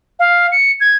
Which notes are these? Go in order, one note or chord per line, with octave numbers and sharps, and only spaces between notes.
F5
C#7
G#6